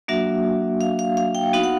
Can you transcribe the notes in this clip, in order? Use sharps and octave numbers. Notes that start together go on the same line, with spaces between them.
F#3 A#3 D4 F#4 E5
F5
F5
F5
G5
B3 D#4 F#4 F5
F#5